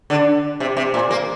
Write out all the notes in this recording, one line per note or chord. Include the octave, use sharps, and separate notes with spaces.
D3
C3
C3
A#2
A#3